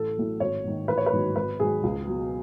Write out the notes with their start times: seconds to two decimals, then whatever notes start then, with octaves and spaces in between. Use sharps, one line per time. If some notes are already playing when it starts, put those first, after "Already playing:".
Already playing: A1 A4
0.17 A2 F#3
0.40 G#1 C#5
0.64 G#2 D#3
0.88 A1 B4
0.97 C#5
1.06 B4
1.13 G#2 D#3 F#3
1.36 G#1 B4
1.60 G#2 D#3 F#3 G#4
1.83 C#2
2.07 B2 F#3